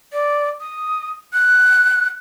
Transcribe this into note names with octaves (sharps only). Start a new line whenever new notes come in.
D5
D#6
F#6